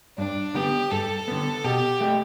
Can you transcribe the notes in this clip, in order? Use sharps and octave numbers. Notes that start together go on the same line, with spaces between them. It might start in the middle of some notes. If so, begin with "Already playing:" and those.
G2 D4
D3 B3 G4
G2 A4
D3 B3
B2 G4
A3 G4